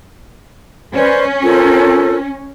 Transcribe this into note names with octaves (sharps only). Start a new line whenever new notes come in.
C#4 B4 C5 D5
F4 A4 A#4 C5